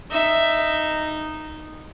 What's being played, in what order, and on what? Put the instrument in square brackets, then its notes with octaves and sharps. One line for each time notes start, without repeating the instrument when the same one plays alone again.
[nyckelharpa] D#4 [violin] E5